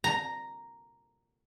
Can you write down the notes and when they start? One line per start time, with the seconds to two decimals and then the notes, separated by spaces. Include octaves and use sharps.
0.04 A#5